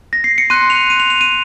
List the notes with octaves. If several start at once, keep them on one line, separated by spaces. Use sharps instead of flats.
A#6
C7
C#7
C6 F#6 D#7
F7
D#7
F7
F7
D#7